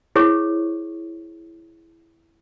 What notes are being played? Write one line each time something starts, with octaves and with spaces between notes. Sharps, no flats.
E4 G#4 C5 C#5 C#6